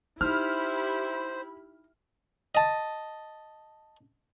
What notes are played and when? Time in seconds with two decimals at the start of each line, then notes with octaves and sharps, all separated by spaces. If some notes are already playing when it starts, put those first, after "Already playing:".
0.21 D#4 E4 G4 C5 B5 F6
2.55 D#5 A5